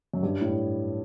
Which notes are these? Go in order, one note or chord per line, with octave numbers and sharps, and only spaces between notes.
F#2
G2
A2